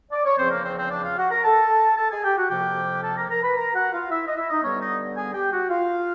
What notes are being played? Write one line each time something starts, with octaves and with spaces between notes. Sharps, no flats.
D5
C#5
E2 C#3 F3 C4 C5
A#3 A#4
C4 C5
C4 C5
D4 D5
F4 F5
F#4 F#5
A#4 A#5
A4 A5
A4 A5
G#4 G#5
G4 G5
F#4 F#5
F2 C3 F3 A#3 G4 G5
A4 A5
A#4 A#5
A#4 A#5
B4 B5
A#4 A#5
F#4 F#5
F4 F5
E4 E5
D#5
E4 E5
D#4 D#5
G2 D3 G3 B3 C#4 C#5
D#4 D#5
G#4 G#5
G4 G5
F#4 F#5
F4 F5